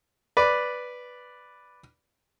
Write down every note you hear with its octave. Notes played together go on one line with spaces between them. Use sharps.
B4 D5